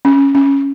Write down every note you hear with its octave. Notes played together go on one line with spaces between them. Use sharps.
C#4
C#4